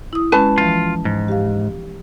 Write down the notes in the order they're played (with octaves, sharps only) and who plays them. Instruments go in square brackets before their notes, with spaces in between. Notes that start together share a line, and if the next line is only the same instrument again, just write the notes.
[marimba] E4 D#6
[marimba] G#3 C#4 [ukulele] B4 A5
[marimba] E3 F3 [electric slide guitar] F4
[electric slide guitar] G#2
[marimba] G4 F5